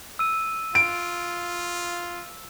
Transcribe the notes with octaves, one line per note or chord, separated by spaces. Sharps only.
E6 D#7
F4 D7